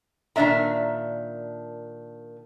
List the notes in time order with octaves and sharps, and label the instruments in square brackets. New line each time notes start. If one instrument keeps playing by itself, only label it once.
[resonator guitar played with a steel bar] A#2 D#3 D4 E5 A#5